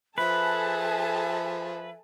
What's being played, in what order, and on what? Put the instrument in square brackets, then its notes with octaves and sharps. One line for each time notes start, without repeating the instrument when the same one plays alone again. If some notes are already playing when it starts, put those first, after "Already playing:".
[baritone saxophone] F3 [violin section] G#4 A4 A5 [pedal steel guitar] B4 [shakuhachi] E5